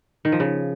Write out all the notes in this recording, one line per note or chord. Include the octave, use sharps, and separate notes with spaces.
D#3
F3
C#3